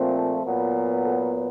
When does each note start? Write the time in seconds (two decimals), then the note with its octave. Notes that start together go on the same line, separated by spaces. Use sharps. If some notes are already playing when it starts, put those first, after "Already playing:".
Already playing: A#2 F3 A3 C4
0.17 A4
0.45 A#2 F#3 B3
1.03 A4